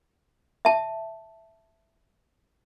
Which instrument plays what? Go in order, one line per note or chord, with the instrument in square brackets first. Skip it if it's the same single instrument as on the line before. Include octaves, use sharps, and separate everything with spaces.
[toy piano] E5 A5